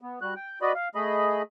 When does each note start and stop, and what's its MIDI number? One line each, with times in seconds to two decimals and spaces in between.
0.01 0.19 59
0.22 0.34 55
0.22 0.34 66
0.22 0.34 90
0.36 0.59 79
0.62 0.72 66
0.62 0.72 71
0.62 0.72 74
0.62 0.72 75
0.62 0.72 83
0.75 0.89 77
0.95 1.42 57
0.95 1.42 68
0.95 1.42 75
0.95 1.42 83